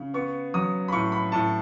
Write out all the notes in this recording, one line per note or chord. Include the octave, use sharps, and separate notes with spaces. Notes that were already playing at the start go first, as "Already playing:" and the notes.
Already playing: C#3
B3 C#6
F#3 D#6
B5
A2 C#6
B5
A2 A5